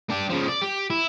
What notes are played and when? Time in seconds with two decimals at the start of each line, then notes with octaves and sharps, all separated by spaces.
0.10 D4 G4
0.30 C#3 F3
0.49 D5
0.62 G4
0.90 E4